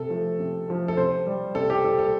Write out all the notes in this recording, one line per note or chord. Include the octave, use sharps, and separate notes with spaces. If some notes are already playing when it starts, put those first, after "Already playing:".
Already playing: C3 A4
F3 A3
C3
F3 A3
A4
C3 C5
G3
C3 A4
G4
G3 A4
A4